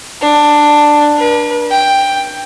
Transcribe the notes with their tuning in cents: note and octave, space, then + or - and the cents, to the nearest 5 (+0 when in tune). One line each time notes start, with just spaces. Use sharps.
D4 +10
B4 -45
G5 +5